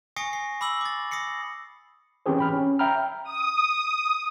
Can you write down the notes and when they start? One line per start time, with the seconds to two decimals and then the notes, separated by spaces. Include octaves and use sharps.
0.16 G#5 C#6 D#6 A#6 C7 C#7
0.33 C7
0.61 B5 D6 E6 F#7
0.81 D6 A6
1.11 D#6 A#6 C7 C#7
2.26 E3 C4 C#4 G4 G#4 C5
2.39 G5 B5 F6
2.53 C#4
2.79 E5 G5 A#5 B5 F6
3.24 D#6